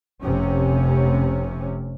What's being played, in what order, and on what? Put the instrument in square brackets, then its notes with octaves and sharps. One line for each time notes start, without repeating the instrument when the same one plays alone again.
[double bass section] F1 C3 C#4